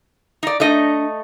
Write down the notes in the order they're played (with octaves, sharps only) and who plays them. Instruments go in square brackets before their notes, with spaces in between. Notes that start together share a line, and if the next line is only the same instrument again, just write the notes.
[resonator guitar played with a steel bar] D#4 D5
[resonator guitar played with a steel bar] A3 D#4 D#5 [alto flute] D4